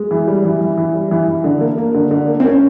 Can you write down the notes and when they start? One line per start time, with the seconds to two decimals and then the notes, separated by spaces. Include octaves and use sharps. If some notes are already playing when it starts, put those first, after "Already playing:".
Already playing: G#3
0.11 E3
0.27 G3
0.44 E3
0.61 E3
0.77 E3
0.94 G3
1.11 E3
1.28 E3
1.44 D3
1.61 A#3
1.78 A#3
1.94 D3
2.11 D3
2.28 A#3
2.40 C4
2.44 A#3 C#4